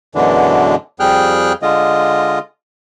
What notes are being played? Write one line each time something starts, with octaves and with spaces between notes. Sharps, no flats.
F#2 B2 D3 E3 G#3 D4
F2 G3 G#4 G5 F6 F#6
D3 G#3 F4 D#5